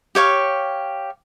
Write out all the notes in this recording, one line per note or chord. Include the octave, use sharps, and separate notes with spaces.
G4 C#5 F5 C#6